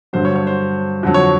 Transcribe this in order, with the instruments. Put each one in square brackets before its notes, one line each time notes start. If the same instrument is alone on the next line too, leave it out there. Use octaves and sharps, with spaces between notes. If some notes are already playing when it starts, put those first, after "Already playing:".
[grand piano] G2 D3 F#3 C5
C#5
C#5
C5
F2 D3 F#3
C#5